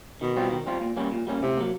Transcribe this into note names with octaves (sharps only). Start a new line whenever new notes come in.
B2 D#3
G3 C4 F4
D#3
G3 C4 F4
A#2
G3 A#3 C#4
A#2
G3 A#3 C#4
A2 C3
F#3 A#3